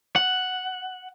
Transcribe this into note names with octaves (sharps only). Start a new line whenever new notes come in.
F#5